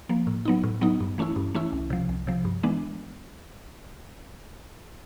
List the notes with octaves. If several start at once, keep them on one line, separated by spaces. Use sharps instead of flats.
F3 A#3
A2
F#3 B3 D#4
A2
F#3 B3 D#4
G2
E3 A3 C#4 E4
G2
E3 A3 C#4 E4
C2
C3 F3
C2
C3 F3
G2
E3 G#3 B3 D4